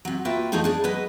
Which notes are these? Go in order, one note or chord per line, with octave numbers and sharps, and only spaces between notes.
C3 F#3
A#3 F4 F#4 B4 E5 G5
E2 F3 A3 D#4 G#4 G#5
D4 G#4 D5
F#3 G#3 B4 D#5